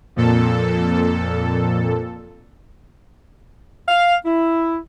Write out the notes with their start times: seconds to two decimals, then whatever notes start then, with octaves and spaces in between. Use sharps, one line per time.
0.16 F2 A#2 A4
3.89 F5
4.26 E4